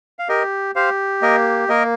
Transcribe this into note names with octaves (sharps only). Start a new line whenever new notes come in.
F5
G4 A#4 D#5
G4 C5 F5
A#3 A#4 D#5
A#3 A#4 D#5